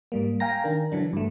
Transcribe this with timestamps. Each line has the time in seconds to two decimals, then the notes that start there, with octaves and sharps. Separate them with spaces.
0.12 G#2 G3 A#3
0.40 F5 G5 G#5 A#5 A#6
0.64 D#3 D4 A#4
0.92 D3 E3 F#3 D4
1.13 G2 A3